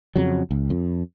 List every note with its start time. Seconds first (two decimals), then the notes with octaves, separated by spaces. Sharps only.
0.16 F2 C#3 F#3
0.51 C#2
0.70 F2